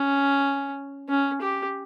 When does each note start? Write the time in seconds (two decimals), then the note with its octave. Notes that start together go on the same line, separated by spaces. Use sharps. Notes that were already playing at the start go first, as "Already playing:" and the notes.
Already playing: C#4
1.09 C#4
1.42 G4